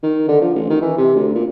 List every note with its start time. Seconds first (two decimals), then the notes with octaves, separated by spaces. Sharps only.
0.03 D#3
0.28 D3
0.42 F3
0.55 A1
0.70 D#3
0.82 E3
0.97 C3
1.15 D2
1.35 A#2